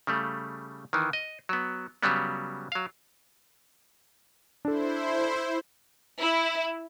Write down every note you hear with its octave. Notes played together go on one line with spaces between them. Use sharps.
C#3 G3 A3
D#3 E3
D#5
F#3 B3
C#3 F#3 G3 B3
F#3 F5
D4 E4 A4 C5
E4